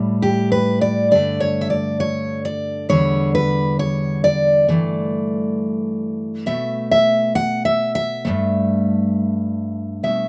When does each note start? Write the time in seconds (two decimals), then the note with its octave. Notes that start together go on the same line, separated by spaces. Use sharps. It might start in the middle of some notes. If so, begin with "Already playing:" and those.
Already playing: A2 G3
0.22 G4
0.52 B4
0.81 D5
1.11 G2 D3 A3 D5
1.40 C#5
1.61 E5
1.70 D5
2.00 C#5
2.45 D5
2.89 E2 D3 G3 C#5
3.35 B4
3.79 C#5
4.24 D5
4.68 G2 E3 A3
6.46 B2 A3 E5
6.91 E5
7.35 F#5
7.65 E5
7.95 E5
8.25 G2 F#3 A3
10.03 B2 A3 E5